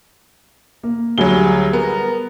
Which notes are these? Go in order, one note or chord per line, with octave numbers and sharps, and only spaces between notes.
A#3
D2 F#3 G3 G#4 G7
B3 A#4